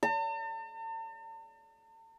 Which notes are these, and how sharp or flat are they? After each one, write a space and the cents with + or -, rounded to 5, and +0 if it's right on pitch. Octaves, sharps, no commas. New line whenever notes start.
A5 +45